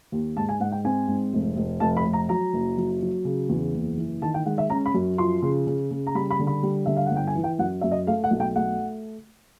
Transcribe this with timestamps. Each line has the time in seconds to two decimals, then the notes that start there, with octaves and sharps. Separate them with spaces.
0.12 D#2
0.37 G#2 A5
0.49 G#5
0.60 G#2 F#5
0.72 G5
0.85 C4 G#5
1.08 G#2
1.33 F1
1.57 F1
1.80 F1 A5
1.97 B5
2.05 F1
2.13 A#5
2.29 F#3 A#5
2.53 F#1
2.78 F#3
3.01 F#3
3.25 C#3
3.49 E2
3.74 F#1
3.97 E3
4.22 D#3 A5
4.34 G5
4.46 G#3 F#5
4.58 E5
4.70 C#4 A#5
4.86 B5
4.94 F#2
5.18 F3 C6
5.42 C#3
5.67 C#3
5.91 C#3
6.07 A#5
6.15 G3 B5
6.30 B5
6.39 D3
6.47 B5
6.63 G3
6.86 D3 E5
6.97 F5
7.06 G1 F#5
7.16 G5
7.27 G#5
7.35 E3
7.44 G5
7.59 F#2 F#5
7.81 F#2 E5
7.91 D#5
8.07 A3 F5
8.24 F#5
8.31 B1
8.40 G5
8.56 A3 F#5